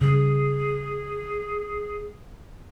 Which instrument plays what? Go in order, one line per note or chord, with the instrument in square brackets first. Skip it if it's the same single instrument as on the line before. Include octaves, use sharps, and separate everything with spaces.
[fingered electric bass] C#3 G3 [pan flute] G#4